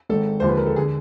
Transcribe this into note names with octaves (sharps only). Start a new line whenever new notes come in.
G#1 G#2 D#3 A4
D#2 D3 F3 G#3 C5
B4
A#4
A4
D3 G#4